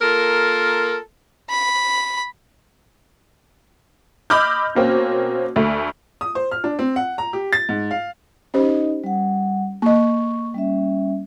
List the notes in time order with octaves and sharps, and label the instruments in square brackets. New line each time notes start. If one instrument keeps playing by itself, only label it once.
[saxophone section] A#3 F4 A4 A#4
[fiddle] B5
[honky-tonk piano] D#5 B5 D6 E6 F6 G6
B2 A#3 C4 C#4
D2 A3
[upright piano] D#6
C5
F6
D4
C4
F#5
A#5
G4
A6
G#2
F5
[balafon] C#4 G4 C5 [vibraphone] D#4 D#5
[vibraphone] G3 F#5
[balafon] A#3 D#5 [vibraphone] C#6
[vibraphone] G3 C#4 E5